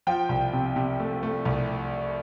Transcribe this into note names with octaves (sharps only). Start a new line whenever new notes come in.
F3 G5
C2
C3
C3
A3
A3
C2